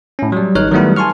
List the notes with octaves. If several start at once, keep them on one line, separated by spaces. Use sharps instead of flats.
A2 C#4
F#3 G3
G#1 D#4 C#5 F6 F#6
D#3 F#3 G3 A3 B3 E4
G#5 A5 C6 C#6 F6